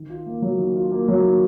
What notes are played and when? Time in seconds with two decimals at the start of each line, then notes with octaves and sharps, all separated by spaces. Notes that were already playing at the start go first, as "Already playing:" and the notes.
Already playing: D#3
0.10 F4
0.26 A#3
0.42 F#3
0.59 D#3
0.76 F4
0.91 A#3
1.08 F#3
1.25 D#3